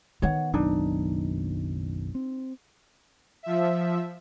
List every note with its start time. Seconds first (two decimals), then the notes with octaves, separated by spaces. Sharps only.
0.22 D#3 B3 C#5 F#5
0.54 F#1 B1 F#2 D4 D#4
2.15 C4
3.43 F3 E5